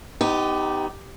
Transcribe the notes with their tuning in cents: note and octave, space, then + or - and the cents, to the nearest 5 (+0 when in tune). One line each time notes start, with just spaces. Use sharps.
B3 +35 D#4 +0 G4 +0